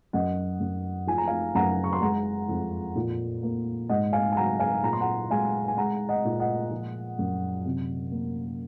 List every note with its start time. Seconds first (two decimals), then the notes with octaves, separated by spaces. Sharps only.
0.13 F#2 D#5 F#5
0.60 F#2
1.07 F3 G#5
1.18 A#5
1.27 F5 G#5
1.55 F#2 F#5 A#5
1.84 C#6
1.93 C6
2.01 G#3 F#5 A#5
2.49 F2
2.96 A#2
3.43 A#3
3.89 G#2 D#5 F#5
4.13 F5 G#5
4.32 G#5
4.36 F#3 F#5 A#5
4.59 F5 G#5
4.83 A#2 A#5
4.93 C6
5.01 F#5 A#5
5.30 G#3 F5 G#5
5.68 G#5
5.77 G#3 F#5 A#5
6.09 D#5 F#5
6.25 A#2
6.40 D#5 F#5
6.71 F3
7.19 F#2
7.66 C3
8.12 A#3